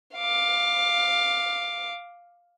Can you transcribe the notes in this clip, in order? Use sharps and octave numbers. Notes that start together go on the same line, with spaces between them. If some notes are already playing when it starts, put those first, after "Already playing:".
F5 D6